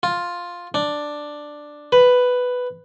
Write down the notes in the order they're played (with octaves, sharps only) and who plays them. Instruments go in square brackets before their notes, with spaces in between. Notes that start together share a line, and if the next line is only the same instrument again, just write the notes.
[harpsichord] F4
D4
B4